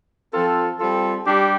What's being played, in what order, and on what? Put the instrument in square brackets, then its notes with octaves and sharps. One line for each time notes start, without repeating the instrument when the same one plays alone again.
[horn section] F3 C4 F4 A4
G3 C4 F4 A4
G3 D4 G4